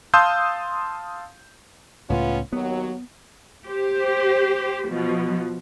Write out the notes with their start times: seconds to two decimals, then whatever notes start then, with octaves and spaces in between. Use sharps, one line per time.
0.14 F5 A5 C6 D#6 E6 G6
2.10 C#2 A2 B3 C#4 F4
2.53 D#2 F#3 B3
3.66 G4 C5
4.88 B2 F3